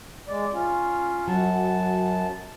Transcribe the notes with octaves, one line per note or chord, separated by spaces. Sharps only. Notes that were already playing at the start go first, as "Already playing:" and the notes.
G#3 D5
C#4 F4
F#2 F#3 A5